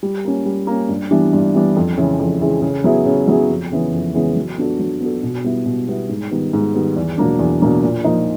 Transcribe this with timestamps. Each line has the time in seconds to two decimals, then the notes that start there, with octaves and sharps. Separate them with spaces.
0.03 G3
0.25 A#3 C#4
0.46 G3
0.67 A#3 C#4
0.89 G2
1.11 E3 G3 B3 D4
1.33 G2
1.54 E3 G3 B3 D4
1.76 F2
1.97 C#3 E3 G#3
2.19 F2
2.41 C#3 E3 G#3
2.62 C#3
2.84 F#3 B3 E4 G#4
3.06 C#3
3.28 F#3 B3 E4 G#4
3.50 F2
3.72 C#3 E3 G#3 B3
3.93 F2
4.14 C#3 E3 G#3 B3
4.36 F#3
4.58 B3 D4 F#4 A4
4.80 F#3
5.01 B3 D4 F#4 A4
5.23 B2
5.44 G3 B3 E4
5.66 B2
5.88 G3 B3 E4
6.09 G#2
6.31 D#3 G3 B3
6.53 G#2
6.74 D#3 G3 B3
6.96 E2
7.17 B2 F#3 A#3 D4
7.39 E2
7.61 B2 F#3 A#3 D4
7.83 A#2
8.04 F3 A#3 D#4